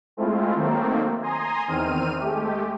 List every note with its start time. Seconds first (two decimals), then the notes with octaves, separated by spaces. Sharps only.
0.17 G#3 A3 C4 E4 F4
0.56 D#3 F#3 A3 A#3 C4
1.22 G#5 A#5 C6 D#6
1.68 E2 D#3 C4 F6 D#7
2.19 G#3 A3 G4